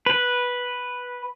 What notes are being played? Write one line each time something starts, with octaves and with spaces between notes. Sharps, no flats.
B4